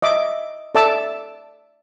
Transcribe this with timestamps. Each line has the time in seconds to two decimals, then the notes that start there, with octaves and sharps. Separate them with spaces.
0.02 D#5 E5 D6
0.75 A4 D5 E5 A5 D6 E6